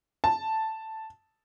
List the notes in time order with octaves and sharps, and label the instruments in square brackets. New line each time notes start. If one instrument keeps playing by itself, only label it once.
[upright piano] A5